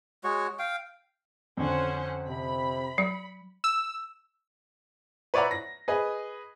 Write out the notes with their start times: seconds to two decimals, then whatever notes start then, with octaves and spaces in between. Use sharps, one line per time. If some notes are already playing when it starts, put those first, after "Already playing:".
0.24 G#3 F#4 C#5
0.59 F5 G5
1.57 F2 D3 C#4 C5 F#5
2.28 C3 B5
2.98 F#3 C#7
3.64 E6
5.34 B4 C#5 D5 E5 F#5 A#5
5.51 A#6
5.88 G#4 B4 D#5